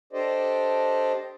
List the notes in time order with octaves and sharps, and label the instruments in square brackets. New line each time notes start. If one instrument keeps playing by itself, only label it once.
[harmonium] D4 G4 A4 C5 D5 D#5